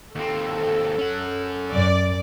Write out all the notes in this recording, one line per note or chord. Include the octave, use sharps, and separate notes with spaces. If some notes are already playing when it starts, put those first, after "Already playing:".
D#2 C4 A4
C#4 F#5
F#2 D5